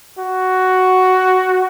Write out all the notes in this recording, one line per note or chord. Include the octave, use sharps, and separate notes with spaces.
F#4